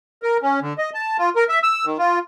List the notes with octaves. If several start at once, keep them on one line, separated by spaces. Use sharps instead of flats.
A#4
C#4
D3
D#5
A5
F4
A#4
E5
E6
D#3
F4